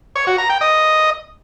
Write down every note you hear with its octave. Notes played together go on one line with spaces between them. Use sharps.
C#5
F#4
A#5
G5
D#5